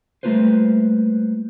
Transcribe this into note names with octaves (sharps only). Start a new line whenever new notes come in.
G3 A3 A#3 F4 B4 C5